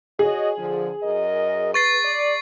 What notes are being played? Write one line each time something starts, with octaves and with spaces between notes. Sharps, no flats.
F#4 G#4 C#5 D#5
D3 F3
F#2 A#4 D#5
B4 C#6 A6 C7
D5